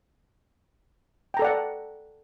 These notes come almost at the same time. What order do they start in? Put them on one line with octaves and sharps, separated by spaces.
G5 A#5 A4 D5 F#5